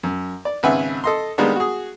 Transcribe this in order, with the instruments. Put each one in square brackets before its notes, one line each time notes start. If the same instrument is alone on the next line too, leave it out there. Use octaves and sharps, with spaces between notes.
[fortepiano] F#2
D5
G#1 C#3 B4 E5 F#5 G#5
A4 D#5 C6
D#3 G3 G#3 A#3 B3 D4
F#4 G#4